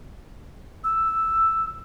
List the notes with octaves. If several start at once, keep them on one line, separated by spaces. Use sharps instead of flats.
E6